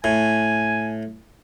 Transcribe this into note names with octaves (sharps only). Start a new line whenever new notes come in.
A2 G#5